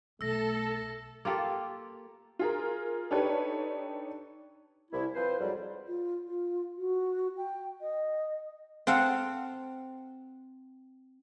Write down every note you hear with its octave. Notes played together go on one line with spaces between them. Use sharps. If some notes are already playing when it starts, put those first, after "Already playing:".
B1 A3 A4 E6 A#6
A#3 F4 G4 A4
F4 G#4 A#4
D4 D#4 G4 A4 B4 C#5
C2 E4
F3 C4 B4 C5
F2 G#2 F#3 G3
F4
F4
F#4
G5
D#5
C4 A4 F5 F#5